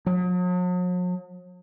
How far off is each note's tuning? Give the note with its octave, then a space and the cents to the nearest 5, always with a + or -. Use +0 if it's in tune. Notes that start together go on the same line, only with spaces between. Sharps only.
F#3 -45